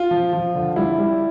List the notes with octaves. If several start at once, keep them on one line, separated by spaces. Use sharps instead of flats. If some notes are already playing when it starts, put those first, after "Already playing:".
Already playing: F4
F3
F3
D3
G3 E4
G3